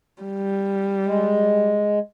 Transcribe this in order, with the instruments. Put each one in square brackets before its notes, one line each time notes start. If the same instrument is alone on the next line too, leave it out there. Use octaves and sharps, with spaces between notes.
[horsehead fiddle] G3
[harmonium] G#3